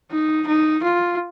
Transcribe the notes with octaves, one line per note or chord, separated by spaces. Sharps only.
D#4
D#4
F4